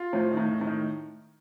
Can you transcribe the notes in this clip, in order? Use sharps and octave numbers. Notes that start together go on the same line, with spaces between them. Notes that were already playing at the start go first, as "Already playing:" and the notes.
Already playing: F4
A2 F3
D#3
A2
D#3
A2
D#3